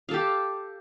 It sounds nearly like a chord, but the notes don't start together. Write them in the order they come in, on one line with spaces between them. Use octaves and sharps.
F5 A4 G4